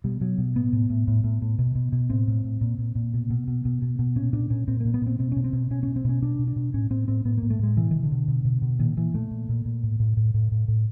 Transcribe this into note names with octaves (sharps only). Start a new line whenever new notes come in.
B2 G3
B2 F#3
B2
A2 B3
A2
A2
A2
A2
A2
B2
B2
B2
A2 C4
A2
A2
A#2
A#2
A#2
B2
B2
B2
B2
B2
B2
A#2 C#4
A#2 D4
A#2 C#4
A#2 C4
A#2 A#3
B3
A#2 C4
B2 C4
B2 C#4
C4
B2
B2 C#4
B2 C#4
C4
B2 C#4
B2 D4
B2
D4
B2
A2 C#4
A2 C4
A2 C4
A2 B3
A2 A#3
A3
A2 G#3
B2 E3
B2 D#3
D3
B2
B2
B2
B2
A#2 D#3
A#2 E3
A#2 A3
A#2
A#2
A#2
A2
A2
A2
A2
A2
A2